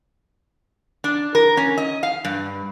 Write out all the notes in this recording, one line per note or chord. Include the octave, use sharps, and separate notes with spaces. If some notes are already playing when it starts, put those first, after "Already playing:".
D4
A#4
C#4
D#5
F5
G2